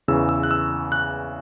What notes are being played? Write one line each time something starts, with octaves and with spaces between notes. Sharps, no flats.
E2 C#3 E3 E6
E6
F#6
E6
F#6